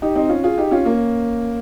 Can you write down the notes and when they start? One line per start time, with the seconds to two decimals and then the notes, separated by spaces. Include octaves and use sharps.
0.02 D#4 G4
0.15 C4 D#4
0.29 C#4 F4
0.44 F4 G#4
0.58 D#4 G4
0.71 C#4 F4
0.85 A#3 C#4